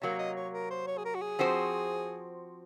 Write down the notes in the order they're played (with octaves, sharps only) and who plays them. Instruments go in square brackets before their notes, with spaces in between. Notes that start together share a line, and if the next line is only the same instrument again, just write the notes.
[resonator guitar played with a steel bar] C3 F#3 A#3 [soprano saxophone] C#5
[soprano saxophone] D#5
C#5
A#4
C5
C#5
G#4
A#4
F#4
G#4
[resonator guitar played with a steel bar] F3 C4 F#4 C5